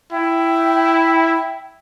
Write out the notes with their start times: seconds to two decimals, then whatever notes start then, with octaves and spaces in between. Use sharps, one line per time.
0.13 E4 G5